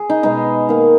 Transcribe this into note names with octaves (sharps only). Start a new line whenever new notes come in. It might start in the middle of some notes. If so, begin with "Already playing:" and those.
Already playing: G#4
D#4
B2 G#3 B3 D#4
D#3 A#3